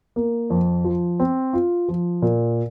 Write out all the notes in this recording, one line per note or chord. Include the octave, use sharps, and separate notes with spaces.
A#3
F2
F3
C4
F4
F3
A#2